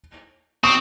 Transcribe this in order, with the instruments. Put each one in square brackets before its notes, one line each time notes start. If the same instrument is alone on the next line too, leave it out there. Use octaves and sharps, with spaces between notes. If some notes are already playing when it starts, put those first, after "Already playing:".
[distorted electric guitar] C4 [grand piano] C#6 D#6